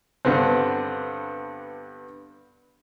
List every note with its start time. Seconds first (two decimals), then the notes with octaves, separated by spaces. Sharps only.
0.25 G2 D3 B3 C4